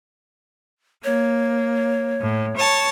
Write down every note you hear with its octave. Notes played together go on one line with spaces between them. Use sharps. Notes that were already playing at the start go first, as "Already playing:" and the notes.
A#3 C#5
A2
C#5 A5